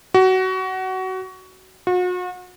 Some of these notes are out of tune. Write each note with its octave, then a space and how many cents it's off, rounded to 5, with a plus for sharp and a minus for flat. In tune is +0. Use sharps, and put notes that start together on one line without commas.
F#4 +20
F#4 -40